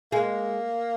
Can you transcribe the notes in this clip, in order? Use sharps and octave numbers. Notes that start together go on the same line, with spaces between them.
G#3 A#3